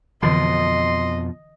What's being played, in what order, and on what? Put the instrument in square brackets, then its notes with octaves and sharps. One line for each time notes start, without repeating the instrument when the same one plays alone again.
[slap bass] F2 B2 F3 [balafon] D3 E3 [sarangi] D#5 [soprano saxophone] C6